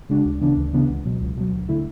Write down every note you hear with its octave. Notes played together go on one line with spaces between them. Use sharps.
C#3 G#3 D4 F#4
D2
C#3 E3 B3 D4
D2
C#3 E3 B3 D4
C#2
B2 F#3
C#2
B2 F#3
D2
D3 A3 E4